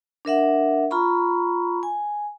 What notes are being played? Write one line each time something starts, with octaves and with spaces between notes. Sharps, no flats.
D4 A#4 E5 F#5
F4 A#5 B5 C#6
G#5